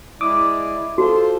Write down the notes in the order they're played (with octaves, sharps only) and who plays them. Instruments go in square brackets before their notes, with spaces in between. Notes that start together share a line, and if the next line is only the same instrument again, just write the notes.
[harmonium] G#3 E4 D5 [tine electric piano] D6 D#6
[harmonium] F4 C5 [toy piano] F#4 [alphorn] A4